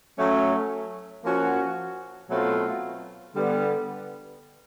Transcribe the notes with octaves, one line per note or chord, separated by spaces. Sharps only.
F#3 A3 C#4
F3 A#3 C#4 F#4
B2 F#3 A3 C4 F4
D3 G3 B3